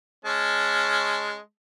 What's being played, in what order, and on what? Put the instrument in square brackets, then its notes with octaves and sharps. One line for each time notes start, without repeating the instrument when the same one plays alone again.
[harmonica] G#3 C#4 A5